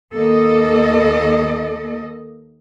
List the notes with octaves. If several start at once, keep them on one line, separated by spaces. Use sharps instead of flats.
D#2 A#3 A4 D#5